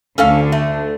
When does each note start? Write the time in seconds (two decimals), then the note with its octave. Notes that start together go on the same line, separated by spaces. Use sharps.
0.18 D2 D3 C#4 A4 F5
0.52 A3